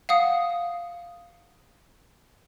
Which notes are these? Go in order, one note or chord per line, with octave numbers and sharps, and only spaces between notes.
F5 F#5 D#6